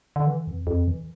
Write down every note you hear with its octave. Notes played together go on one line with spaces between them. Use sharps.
D3
E3
F2
F2
E3